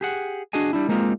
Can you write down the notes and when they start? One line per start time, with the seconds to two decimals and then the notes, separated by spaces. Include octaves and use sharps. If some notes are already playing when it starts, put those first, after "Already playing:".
0.01 G4 G#4 F#5
0.53 D4 F#4 G#4 D#5 G#5
0.73 G3 D4 E4
0.88 G#3 A#3 C4 D#4 F4